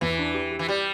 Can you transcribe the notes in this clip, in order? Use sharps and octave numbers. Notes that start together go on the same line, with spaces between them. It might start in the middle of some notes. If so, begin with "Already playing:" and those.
E2 E3
D4
G4
G4
E3
G3 G4